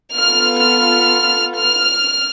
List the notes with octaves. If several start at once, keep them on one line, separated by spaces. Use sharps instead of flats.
B3 F4 A4 F6
F6
F6